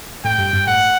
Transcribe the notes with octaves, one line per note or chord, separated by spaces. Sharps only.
A2 G5
G2
G2
A2 F#5